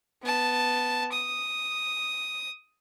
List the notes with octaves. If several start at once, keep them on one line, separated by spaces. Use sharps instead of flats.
B3 A5
D#6